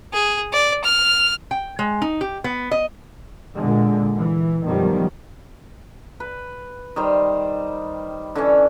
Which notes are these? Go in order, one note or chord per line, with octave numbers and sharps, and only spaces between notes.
G#4
D5
F6
G5
G#3
D#4
G4
B3
D#5
A#2 D3 G#3
E3
F#2 B2 D#3 F3 G3
B4
D#3 G3 C5
D3 E3 C#4